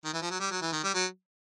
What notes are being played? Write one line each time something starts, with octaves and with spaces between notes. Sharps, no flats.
D#3
E3
F3
F#3
G3
F#3
E3
D#3
G3
F#3